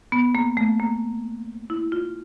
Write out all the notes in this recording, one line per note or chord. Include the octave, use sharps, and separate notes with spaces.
B3
A#3
A3
A#3
E4
F4